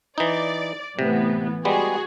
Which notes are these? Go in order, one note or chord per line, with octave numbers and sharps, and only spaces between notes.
E3 D#4 D5
A2 C3 E3 B3
G3 G#3 B3 F#4 G#4